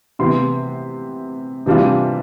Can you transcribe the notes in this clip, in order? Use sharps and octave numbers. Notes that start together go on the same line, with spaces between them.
C3 E3 B3 C6
C3 E3 G3 D4 F4